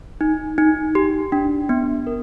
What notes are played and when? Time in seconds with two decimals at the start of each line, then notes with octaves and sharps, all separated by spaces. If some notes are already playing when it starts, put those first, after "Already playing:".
0.21 D#4
0.58 D#4
0.95 G4
1.32 D4
1.69 B3
2.07 A#4